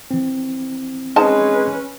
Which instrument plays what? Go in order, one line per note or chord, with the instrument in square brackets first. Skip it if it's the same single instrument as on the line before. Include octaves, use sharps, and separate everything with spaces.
[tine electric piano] E3 C4
[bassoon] G#3 [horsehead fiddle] C#4 B4 [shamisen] D#4 C5 A5